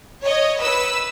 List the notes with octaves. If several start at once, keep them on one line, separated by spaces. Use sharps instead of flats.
C#5 D#5
B4 E6